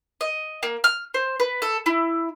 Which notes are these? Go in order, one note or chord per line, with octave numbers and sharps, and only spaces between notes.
D#5
A#3
F6
C5
B4
A4
E4